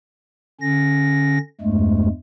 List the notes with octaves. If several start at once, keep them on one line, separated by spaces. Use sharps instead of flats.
D3 C#4 A#6
E2 G2 G#3 A3